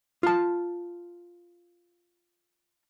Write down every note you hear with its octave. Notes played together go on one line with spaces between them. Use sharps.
F4 A5